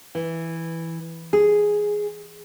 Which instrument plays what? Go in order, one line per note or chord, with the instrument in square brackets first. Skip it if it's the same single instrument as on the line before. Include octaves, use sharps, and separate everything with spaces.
[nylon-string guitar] E3
G#4